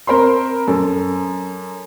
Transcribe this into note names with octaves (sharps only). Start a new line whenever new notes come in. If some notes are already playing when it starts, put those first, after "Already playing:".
C4 A#4 C5 B5 C6
F#2 A4